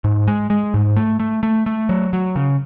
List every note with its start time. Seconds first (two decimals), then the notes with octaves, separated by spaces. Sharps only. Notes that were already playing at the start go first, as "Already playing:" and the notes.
0.04 G#2
0.27 G#3
0.50 G#3
0.74 G#2
0.96 A3
1.20 A3
1.43 A3
1.66 A3
1.89 F#3
2.13 F#3
2.36 C#3